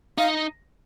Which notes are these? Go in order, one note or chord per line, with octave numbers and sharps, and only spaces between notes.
D#4 F5